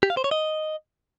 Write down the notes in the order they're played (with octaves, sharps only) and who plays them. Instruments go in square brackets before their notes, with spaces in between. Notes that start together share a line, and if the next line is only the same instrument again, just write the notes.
[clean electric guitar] G4
F5
C5
C#5
D#5